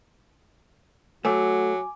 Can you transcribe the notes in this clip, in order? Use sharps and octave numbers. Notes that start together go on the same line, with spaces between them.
F#3 A3 F#4 G#5 D6